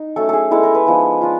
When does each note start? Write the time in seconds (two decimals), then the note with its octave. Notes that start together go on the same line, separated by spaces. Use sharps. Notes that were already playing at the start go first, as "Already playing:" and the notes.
Already playing: D#4
0.16 F#3 A3 C#4 A4
0.29 G#4 A4
0.51 G#3 B3 E4 A4
0.63 A#4
0.75 B4
0.86 F3 G#3 B3 D#4
1.21 D4 F4